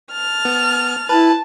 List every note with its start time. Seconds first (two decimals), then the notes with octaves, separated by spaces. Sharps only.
0.12 A5 F6
0.45 B3
1.09 E4 B4 A5